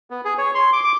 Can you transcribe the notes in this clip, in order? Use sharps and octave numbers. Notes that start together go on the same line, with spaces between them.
B3
G#4
C#5
C6
D6
D6